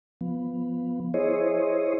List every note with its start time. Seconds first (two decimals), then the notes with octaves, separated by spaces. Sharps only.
0.21 F3 B3
1.14 E4 G#4 C5 C#5 D#5